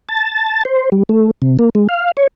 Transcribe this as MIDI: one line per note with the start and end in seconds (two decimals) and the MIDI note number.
0.09 0.63 81
0.65 0.90 72
0.92 1.03 55
1.09 1.31 57
1.42 1.57 48
1.59 1.70 58
1.75 1.87 56
1.89 2.11 77
2.17 2.27 73